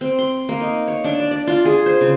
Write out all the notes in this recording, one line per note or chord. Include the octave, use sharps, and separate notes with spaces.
C4
C6
A#3
D#4
C#5
D4
D5
D5
F4
G#4
C5
C#3